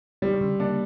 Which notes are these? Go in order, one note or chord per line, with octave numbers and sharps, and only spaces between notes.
C#3 G3
D3
C#3
A#3 D4